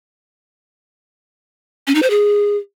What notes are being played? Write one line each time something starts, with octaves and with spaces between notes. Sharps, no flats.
C#4
D#4
C5
G#4